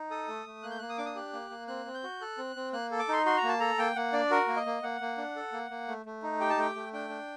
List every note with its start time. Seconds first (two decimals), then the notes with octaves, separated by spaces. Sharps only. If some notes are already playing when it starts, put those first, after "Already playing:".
Already playing: D#4
0.11 A4 D#6
0.28 A3
0.46 A3
0.63 A#3 F#6
0.71 G6
0.79 A#3 F#6
0.89 D#6
0.98 D4 D6
1.06 D#6
1.15 G4 F#6
1.33 A#3
1.50 A#3
1.68 C4 F#6
1.85 C4
1.94 G6
2.03 F#4
2.21 A4 F#6
2.38 C4
2.56 C4
2.73 A#3 F#6
2.91 A4
2.99 D6
3.09 D#4 C6
3.26 F#4 C6
3.37 A#5
3.43 A#3 A5
3.60 A4 A#5
3.79 A#3 G5
3.96 A#3 F#5
4.13 D4 D5
4.30 F#4 A#4
4.47 A#3
4.56 D#5
4.66 A#3
4.83 A#3 F#5
5.01 A#3
5.17 D4
5.36 A4
5.52 A#3
5.71 A#3
5.88 A3
6.06 A3
6.23 D#4
6.40 G4 G5
6.50 A5
6.58 A3 G5
6.75 A3
6.93 D4 G5
7.10 D4